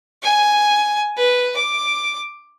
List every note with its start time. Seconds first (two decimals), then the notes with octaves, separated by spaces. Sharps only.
0.23 G#5
1.17 B4
1.56 D6